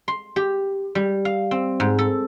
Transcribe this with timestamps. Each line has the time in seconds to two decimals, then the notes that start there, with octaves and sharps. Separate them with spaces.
0.08 C6
0.36 G4
0.95 G3
1.25 F5
1.51 C4
1.80 G#2
1.99 A4